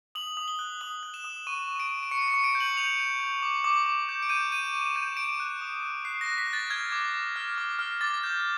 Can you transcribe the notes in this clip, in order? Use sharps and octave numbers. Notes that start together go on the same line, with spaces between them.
D#6 F#7
D#6
G7
F#6
D#6 F#7
F#6
E7
D#6
C#6 D#7
C#6
D7
C#6
D7
C#6 C#7
C#7
C#6
D7
G6
F#7
G6 F7
G6
G6
D6
D6
D6
G6
D7
G6 D#7
G6 D#7
C#6 E7
G6 D#7
C#6 D7
F#6
D#6
F#6
F#6 C7
A#6
F#6
B6
F#6
A6
F6 G#6
D6
D6
F6
D6
F6
D6 A6
G6